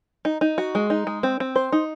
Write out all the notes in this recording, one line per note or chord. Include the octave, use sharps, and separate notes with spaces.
D#4
D#4
F#4
G#3
D#4
G#3
C4
C4
C5
D#4